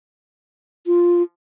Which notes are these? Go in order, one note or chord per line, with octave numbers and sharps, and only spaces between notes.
F4